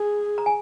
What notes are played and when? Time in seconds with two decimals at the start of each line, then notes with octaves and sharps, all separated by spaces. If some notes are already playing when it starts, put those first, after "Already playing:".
Already playing: G#4 G#5
0.38 A#5
0.46 G#5